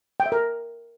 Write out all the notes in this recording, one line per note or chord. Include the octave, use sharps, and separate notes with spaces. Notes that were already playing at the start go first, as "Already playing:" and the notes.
G5
E5
A#4